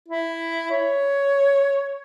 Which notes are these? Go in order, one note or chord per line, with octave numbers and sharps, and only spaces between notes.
E4
C#5